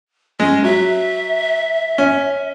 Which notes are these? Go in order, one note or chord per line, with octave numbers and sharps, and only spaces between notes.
G#3 C#4
F#3 E5
C#4